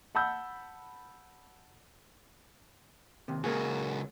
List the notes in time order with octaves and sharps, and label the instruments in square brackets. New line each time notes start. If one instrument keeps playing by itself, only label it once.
[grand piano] F#5 A5 B5 E6 G6
[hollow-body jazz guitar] D#2 C3
[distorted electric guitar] C#2 F#4 [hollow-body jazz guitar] A#3 G#4